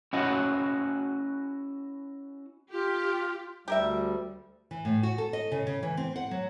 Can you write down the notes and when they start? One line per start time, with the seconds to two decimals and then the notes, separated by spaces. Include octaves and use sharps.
0.13 C#4 E4 F#4 D#5 F#5
2.72 F4 G4
3.68 D2 G3 G4 A#4 E5
4.71 E3
4.85 A2
5.03 F#4
5.18 A4
5.33 D#5
5.52 C#3
5.67 C#3
5.83 E3
5.97 C4
6.16 F#5
6.31 F#3